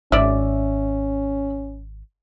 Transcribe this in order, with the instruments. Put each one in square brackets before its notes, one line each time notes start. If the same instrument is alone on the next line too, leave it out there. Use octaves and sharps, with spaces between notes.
[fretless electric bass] G#1 [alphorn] C#4 [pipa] D5 E5